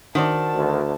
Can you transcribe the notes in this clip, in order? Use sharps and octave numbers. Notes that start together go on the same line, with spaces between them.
D#3 F#4 C5 D5 A5
D2